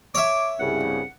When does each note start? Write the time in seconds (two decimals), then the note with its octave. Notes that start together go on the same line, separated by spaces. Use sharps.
0.15 C#5 E5 D6
0.60 C2 G2 C#3 F#5